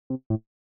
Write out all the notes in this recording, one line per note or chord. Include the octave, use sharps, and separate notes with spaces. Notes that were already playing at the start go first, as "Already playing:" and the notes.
C3
A2